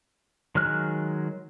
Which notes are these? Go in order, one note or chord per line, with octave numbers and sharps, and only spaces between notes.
D#3 F#3 G#3 F6 F#6